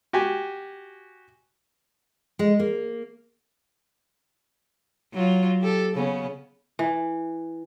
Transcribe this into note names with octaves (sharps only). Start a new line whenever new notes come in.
F#4 G4 G#5
G#3
A#3
F#3 F4
G4 A4
C#3 B3 C#4
E3